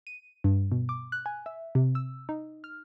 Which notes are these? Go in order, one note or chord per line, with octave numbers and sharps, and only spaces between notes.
D#7
G2
B2
D6
F#6
G#5
E5
C3
E6
D#4
F6